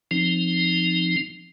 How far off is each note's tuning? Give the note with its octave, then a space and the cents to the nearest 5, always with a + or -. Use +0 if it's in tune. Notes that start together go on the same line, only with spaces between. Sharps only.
F3 +0 C4 +0 D#4 +0